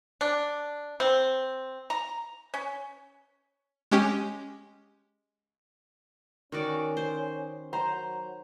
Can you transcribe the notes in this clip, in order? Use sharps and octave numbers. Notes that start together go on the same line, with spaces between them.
D4
C4
A#5
C#4
G#3 C#4 G4
D#3 C#4 F#4 D5
C5
F#3 C5 A#5